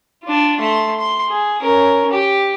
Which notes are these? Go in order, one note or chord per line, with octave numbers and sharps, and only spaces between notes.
D4 F4
A3 C6
C6
G#4
C#4 A#4
G4